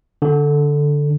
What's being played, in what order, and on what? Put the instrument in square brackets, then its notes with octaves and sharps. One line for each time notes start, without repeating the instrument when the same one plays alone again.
[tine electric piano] D3